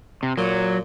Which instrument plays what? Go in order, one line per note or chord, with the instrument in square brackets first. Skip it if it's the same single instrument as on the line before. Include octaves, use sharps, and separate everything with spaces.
[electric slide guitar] C3
[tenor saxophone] A#2 [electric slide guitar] F#3